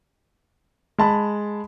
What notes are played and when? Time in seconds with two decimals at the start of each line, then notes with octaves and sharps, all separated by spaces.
0.98 G#3 A5 B5